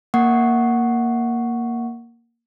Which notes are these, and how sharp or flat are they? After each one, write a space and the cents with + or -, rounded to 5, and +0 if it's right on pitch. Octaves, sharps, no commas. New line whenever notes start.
A#3 +0 F#5 +0 C#6 +0